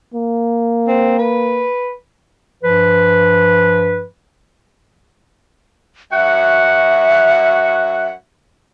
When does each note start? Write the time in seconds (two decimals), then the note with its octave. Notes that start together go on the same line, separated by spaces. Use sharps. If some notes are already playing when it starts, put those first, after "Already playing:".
0.14 A#3
0.88 C4
1.19 B4
2.63 G2 F3 B4
6.12 F#2 F#4 E5 F#5